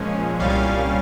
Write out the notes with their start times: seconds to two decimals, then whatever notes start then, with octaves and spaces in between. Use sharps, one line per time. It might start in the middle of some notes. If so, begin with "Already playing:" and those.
Already playing: A#2 F3 G#3 C#4
0.40 C2 A#2 G3 C#4 F5
0.50 F5